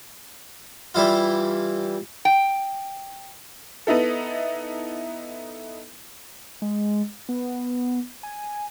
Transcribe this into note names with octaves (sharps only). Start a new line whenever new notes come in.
E3 G3 E4 F4
G5
B3 D#4 E4 A4
G#3
B3
G#5